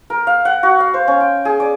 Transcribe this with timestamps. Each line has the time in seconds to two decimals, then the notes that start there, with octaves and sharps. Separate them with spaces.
0.10 A#4
0.27 F5
0.45 F#5
0.63 F#4
0.80 F5
0.94 C5
1.07 C#4
1.20 G5
1.45 G#4
1.60 D5